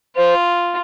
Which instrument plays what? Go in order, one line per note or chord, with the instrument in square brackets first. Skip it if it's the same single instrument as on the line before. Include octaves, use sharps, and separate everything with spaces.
[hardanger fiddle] F4 [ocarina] C5